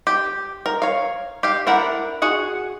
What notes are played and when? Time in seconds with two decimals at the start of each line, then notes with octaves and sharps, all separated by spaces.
0.07 G4
0.66 A#4
0.82 C#5 F5
1.43 G4 F5
1.67 D4 E4 A#4 F#5
2.22 F#4 G#4 F#5